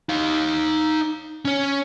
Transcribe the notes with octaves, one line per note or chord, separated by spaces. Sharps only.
D#4 F5
C#4 C#5